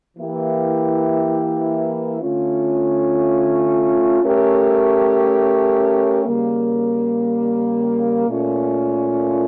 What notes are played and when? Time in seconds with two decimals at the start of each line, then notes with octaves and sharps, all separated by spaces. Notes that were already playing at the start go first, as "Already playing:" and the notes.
0.17 E3 A#3 E4 G4
2.21 D3 A3 C#4 F4
4.23 A3 C#4 G4 A#4
6.25 C#3 G3 A#3
8.27 A#2 A3 C#4 F4